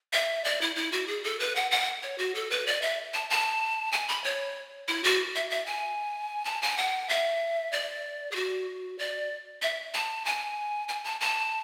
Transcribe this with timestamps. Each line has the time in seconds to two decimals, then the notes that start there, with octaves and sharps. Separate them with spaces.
0.13 E5
0.44 D5
0.61 E4
0.76 E4
0.92 F#4
1.08 G#4
1.24 A4
1.40 B4
1.56 F#5
1.71 F#5
2.03 C#5
2.18 F#4
2.35 A4
2.51 B4
2.67 D5
2.82 E5
3.14 A5
3.30 A5
3.92 G#5
4.08 B5
4.24 C#5
4.88 E4
5.04 F#4
5.36 E5
5.50 E5
5.66 G#5
6.45 A5
6.62 G#5
6.78 F#5
7.09 E5
7.72 D5
8.32 G#4
8.35 F#4
8.99 D5
9.62 E5
9.94 A5
10.25 G#5
10.89 G#5
11.04 A5
11.21 A5